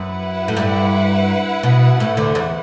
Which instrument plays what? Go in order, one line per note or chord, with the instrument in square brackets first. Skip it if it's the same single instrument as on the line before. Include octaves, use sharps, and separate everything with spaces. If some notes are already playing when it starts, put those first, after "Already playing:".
Already playing: [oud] F#2 [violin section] E4 B4 F#5
[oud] A2
G2
B2
A2
D2 D3
E2